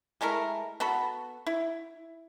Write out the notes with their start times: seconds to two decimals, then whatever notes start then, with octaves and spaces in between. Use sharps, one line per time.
0.21 G#3 A3 E4 A#4
0.80 B3 F#4 A4 B5
1.46 E4